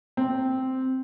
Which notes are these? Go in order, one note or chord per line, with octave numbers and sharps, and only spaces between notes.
C4